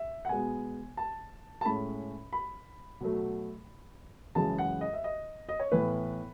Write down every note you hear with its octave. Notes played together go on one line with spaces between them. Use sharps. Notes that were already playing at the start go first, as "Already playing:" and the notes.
Already playing: E5
F#5
B2 G#3 B3 G#5
A5
A5
A2 G#3 C#4 B5
B5
B2 F#3 A3
F#2 C#3 E3 G#3 A5
F#5
D#5
E5
D#5
D#5
C#5
A2 E3 B3 B4